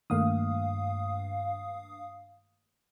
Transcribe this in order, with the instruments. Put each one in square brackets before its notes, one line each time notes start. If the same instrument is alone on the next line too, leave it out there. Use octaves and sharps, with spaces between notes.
[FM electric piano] G2 F5 D#6 [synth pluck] D#3 A3 A#3